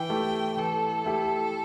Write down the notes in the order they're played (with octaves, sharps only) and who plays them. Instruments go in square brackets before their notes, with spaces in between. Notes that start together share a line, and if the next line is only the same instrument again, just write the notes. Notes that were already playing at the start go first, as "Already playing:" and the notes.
Already playing: [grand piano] E3 [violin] G5
[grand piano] A3 E4 G4
[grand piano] E3 [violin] A4
[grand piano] A3 E4 G4